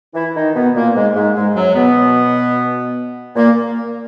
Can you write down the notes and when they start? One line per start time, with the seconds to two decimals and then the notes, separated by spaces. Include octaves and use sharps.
0.14 E3 E4
0.35 D#3 D#4
0.54 B2 B3
0.75 A#2 A#3
0.95 G#2 G#3
1.15 G#2 G#3
1.35 G#2 G#3
1.55 F#2 F#3
1.75 B2 B3
3.35 A#2 A#3